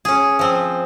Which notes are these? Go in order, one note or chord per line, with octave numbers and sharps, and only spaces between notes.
C#4 G#4
F3 C4